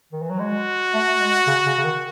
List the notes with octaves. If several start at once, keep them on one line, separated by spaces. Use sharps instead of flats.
D#3
E3
F#3
G#3 F#4
A3
G#3
C#3
C#3
C#3
D#3